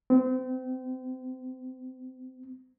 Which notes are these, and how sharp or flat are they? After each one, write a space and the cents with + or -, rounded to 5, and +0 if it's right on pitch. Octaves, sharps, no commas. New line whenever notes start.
C4 -30